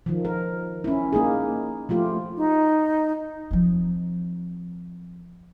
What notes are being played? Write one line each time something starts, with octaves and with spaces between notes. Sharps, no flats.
D#3 F3
A#4
C#4 E4
A#3 D#4 G#4
F3 A3 F4 G4
D#4
F3 C4